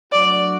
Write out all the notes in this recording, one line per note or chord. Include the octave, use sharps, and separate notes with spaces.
F#3 A3 D4 F#4 D5